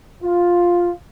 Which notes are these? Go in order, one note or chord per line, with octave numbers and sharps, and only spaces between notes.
F4